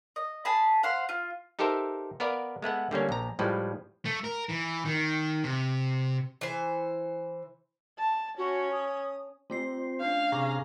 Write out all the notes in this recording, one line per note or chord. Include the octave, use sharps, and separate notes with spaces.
D#5
G#4 A5 B5
C5 F5 F#5
F4
D#4 G4 A4 A#4 C5 E5
B3 A#4 B4 D5 F5
G#3 A3 B3 F#5
D3 G3 A#3 C#4
A#1 A#5
A2 F3 G3 G#3 B4
A3
A#4
E3
D#3
C3
E3 C5
A5
C#4 F#4
D#6
A3 C4 F4 C7
C#4 D4 F5
C3 G#4 A#5 C#6 D6